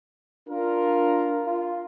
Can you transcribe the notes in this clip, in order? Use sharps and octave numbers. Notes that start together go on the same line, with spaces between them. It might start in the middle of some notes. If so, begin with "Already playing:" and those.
D4 F4 A#4
F4